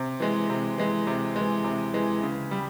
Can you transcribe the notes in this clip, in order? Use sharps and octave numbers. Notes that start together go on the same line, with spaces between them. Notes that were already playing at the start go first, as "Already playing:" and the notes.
Already playing: C3
E3 G#3
C3
E3 G#3
C3
E3 G#3
C3
E3 G#3
C#3
G3